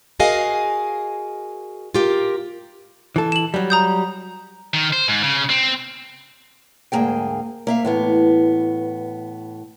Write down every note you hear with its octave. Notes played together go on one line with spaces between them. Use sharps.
F#4 G#4 A#4 D#5 F5 G#5
F4 G4 A#4
E3 A4
E7 F#7
F#3 G3
A#5 D#6 G6
D#3
C5
G#2
C#3
C4
D2 G#2 C3 A#3 G#4 G5
A#3 E5 F5
A2 E3 B3